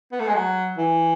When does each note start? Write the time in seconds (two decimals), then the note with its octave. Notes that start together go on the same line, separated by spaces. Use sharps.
0.12 B3
0.20 A3
0.28 G#3
0.35 F#3
0.78 E3